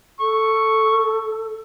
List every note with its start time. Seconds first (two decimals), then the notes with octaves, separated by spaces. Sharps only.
0.20 A4 C#6